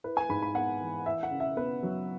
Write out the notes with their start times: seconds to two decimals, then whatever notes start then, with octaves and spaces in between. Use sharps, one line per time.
0.04 E4 B4
0.17 G#5
0.29 G#2 B5
0.42 B5
0.55 B3 F#5
0.80 E3
1.06 E4 E5
1.23 F#5
1.31 C#3
1.40 E5
1.57 B3 B4
1.83 F#3